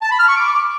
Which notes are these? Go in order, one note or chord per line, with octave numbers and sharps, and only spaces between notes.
A5
B5
F6
C#6
D6